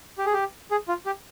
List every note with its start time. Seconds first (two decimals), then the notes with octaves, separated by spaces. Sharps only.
0.18 G4
0.26 G#4
0.33 G4
0.71 G#4
0.88 F4
1.06 G4